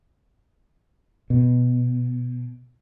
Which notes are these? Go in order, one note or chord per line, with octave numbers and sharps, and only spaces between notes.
B2